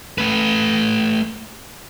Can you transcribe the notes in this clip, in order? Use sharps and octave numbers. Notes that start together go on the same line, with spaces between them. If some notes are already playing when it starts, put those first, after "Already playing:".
A3 B4